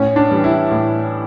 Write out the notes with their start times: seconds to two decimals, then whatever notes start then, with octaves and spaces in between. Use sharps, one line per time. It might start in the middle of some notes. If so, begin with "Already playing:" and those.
Already playing: A2 C#4
0.16 D4
0.30 E3 G3
0.44 E4
0.71 A2